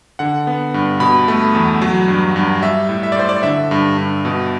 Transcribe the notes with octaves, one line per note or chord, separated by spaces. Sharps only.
D3 F#5
B3
G2
B2 B5
A3
E2
F#3
G2
G2
G3 E5
A2
E5
D5
A2 C5
D5
D3 E5
G2
G2
B2